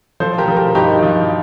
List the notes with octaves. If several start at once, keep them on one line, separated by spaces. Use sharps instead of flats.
F3 A4 C5
G4 A#4
F3
G4 A#4
G2 D#4 G4
F3